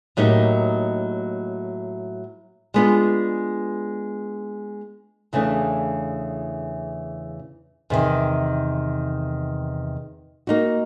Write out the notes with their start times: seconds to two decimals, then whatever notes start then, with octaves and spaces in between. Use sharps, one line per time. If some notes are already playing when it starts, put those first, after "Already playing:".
0.17 A2 F#3 A#3 D#4 G4
2.74 G#3 B3 D4 F4
5.33 E2 C#3 E3 A3 D4
7.90 E2 C3 D#3
10.47 A#3 D#4 F#4